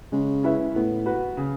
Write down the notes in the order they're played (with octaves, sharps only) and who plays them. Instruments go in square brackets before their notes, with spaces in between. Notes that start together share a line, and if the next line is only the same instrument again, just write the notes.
[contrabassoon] C#3 [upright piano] G#3
[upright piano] C#4 E4 B4 E5
[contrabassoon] A2 [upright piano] B3
[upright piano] F#4 B4
C#3